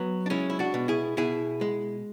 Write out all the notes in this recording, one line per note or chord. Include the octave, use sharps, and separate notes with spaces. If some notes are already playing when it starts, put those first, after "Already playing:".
Already playing: F#3 B3
D4
G#3 C#4 E4
E4
D4 F#4
B2
E4 G#4
B2 E4 G#4
G#3